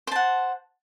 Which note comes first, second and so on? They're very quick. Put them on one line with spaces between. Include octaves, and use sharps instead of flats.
C5 A5 F#5